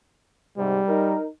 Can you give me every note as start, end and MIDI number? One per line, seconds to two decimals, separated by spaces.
0.58 0.81 44
0.58 0.81 48
0.58 1.17 55
0.88 1.26 63
0.88 1.26 70